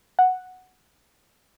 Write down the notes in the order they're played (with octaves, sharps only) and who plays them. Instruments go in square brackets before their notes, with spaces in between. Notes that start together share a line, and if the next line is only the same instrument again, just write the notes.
[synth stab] F#5